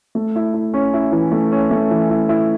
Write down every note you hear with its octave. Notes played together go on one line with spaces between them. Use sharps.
A3
E4
E4
C#4
E4
E3
A3
C#4
A3
E3
E4
E4